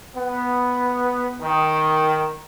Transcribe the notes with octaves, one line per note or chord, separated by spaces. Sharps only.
B3
D#3